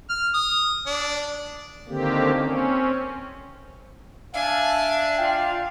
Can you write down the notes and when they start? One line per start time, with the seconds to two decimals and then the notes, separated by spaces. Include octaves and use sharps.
0.10 F6
0.34 D#6
0.86 D4
1.89 D3 D#3 A#3 C4 G4
2.38 C4 C#4
4.34 D4 E5 F5 G#5 A5
5.18 F4 D5 F5 G5